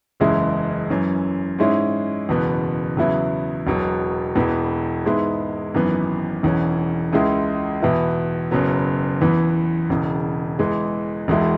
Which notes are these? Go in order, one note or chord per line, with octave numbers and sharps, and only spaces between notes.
F#1 E2 C#3 G#3 E4
F#2 E3 C#4
G#2 G#3 C#4 E4
F#1 E2 B2 B3
E2 C#3 F#3 B3 E4
E1 E2 B2 F#3
E1 E2 E3 B3
G#2 G#3 B3 E4
G#1 F#2 E3 B3
E1 E2 E3 C#4
C#2 C#3 G#3 E4
E2 B2 B3 E4
F#1 F#2 F#3 B3
E2 E3 B3
E1 E2 C#3
E2 E3 G#3
E1 E2 B2 G#3 E4